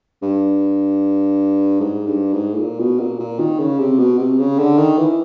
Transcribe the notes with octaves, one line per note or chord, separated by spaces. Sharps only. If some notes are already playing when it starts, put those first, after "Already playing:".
G2
G#2
G2
G#2
A2
A#2
B2
A#2
A#2
D#3
C#3
C3
B2
C3
C#3
D3
D#3
E3